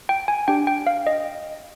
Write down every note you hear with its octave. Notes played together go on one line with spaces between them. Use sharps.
G5
G#5
D4 G4 G5
G5
F5
D#5